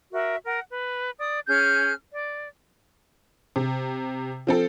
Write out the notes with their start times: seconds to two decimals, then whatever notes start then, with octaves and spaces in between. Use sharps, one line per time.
0.12 F#4 A#4 E5
0.45 A#4 F#5
0.70 B4
1.19 D5 D#6
1.48 C#4 G#4 F6 G6
2.12 D5
3.56 C3
4.47 F3 C4 A4